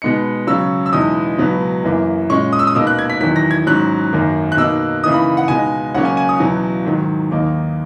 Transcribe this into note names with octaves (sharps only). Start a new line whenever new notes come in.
B2 G#3 B3 D#4 C#7
C#3 F#3 C#4 E6
E6
E2 B2 G#3 D#4 D#6
C#2 B2 F#3 B3
F#2 E3 A#3
A#2 G#3 C#4 C#6
D#6
E6
D#6
B2 A#3 D#4 E6
F#6
G#6
B6
E2 D#3 F#3 B6
A#6
G#6
G#2 F#3 C#4 F#6
F#2 D#3 A#3
F#6
B2 A#3 D#4 E6
C#3 E3 A#3 D#4 D#6
B5
F#5
C#2 B2 G#3 D#4 G#5
C#2 C#3 F#3 A#3 C#4 F#5
G#5
G#5
D#6
E2 B2 F#3
G#2 D#3 F#3
D#2 D#3 A#3 D#4